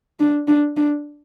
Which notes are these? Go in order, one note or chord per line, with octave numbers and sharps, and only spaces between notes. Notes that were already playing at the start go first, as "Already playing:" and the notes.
D4
D4
D4